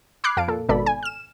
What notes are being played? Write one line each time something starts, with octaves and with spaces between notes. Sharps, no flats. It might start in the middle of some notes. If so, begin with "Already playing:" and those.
B5 D6 F6 F#6 G#6 C7
F2 F5 A5 D7
A#2 A4
G#1 B2 A4 D5 B5
G#5
F6 E7